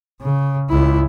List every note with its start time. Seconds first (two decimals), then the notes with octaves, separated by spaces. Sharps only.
0.21 C#3
0.70 C#2 E4